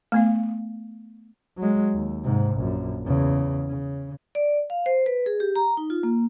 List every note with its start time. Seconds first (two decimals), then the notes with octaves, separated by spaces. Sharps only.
0.12 A3 B3 F5
1.58 F#3 G#3
1.94 D#2
2.24 G#2 C3
2.56 A#1 F#2
3.06 E2 C#3
3.68 C#3
4.35 D5
4.70 F5
4.86 C5
5.06 B4
5.26 G#4
5.40 G4
5.56 A#5
5.77 D#4
5.90 F4
6.03 A#3